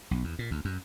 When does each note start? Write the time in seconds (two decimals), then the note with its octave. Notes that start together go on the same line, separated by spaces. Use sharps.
0.11 B1
0.24 E2
0.39 A#2
0.51 D2
0.65 F#2